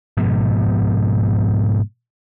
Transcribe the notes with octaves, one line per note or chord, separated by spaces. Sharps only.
G#2 B2 F3